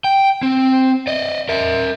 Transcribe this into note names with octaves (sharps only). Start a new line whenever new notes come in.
G5
C4
D5 D#5
A#4 E5